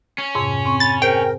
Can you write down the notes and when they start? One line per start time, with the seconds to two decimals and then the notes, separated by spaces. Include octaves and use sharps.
0.18 C#4
0.35 F2 G#2 C3
0.65 C4 C#6
0.80 B5 A6
1.02 G#4 A#4 C5 G5 G#5